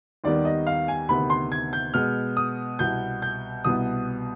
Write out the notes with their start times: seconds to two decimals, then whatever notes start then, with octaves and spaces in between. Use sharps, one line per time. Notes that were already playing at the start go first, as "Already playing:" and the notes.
0.24 D#2 D#3 G3 B3 D5
0.45 D#5
0.67 F5
0.88 G#5
1.09 D2 C3 D#3 B3 B5
1.30 C6
1.52 G#6
1.73 G6
1.94 B2 G#3 B3 F6
2.37 D#6
2.79 C2 B2 B3 G6
3.22 G6
3.64 C2 B2 B3 D#6